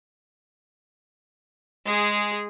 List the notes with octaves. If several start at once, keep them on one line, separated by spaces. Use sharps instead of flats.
G#3 G#4